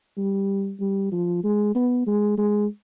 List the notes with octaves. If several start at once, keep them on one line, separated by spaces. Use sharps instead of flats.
G3
G3
F3
G#3
B3
G#3
G#3